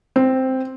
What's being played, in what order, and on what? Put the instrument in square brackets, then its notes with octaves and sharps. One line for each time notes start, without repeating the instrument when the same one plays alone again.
[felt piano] C4